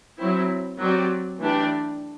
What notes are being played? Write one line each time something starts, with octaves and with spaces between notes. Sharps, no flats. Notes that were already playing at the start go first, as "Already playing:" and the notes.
F#3 C4 E4
F#3 C4 G4 D5
E3 A3 D4 G4 D5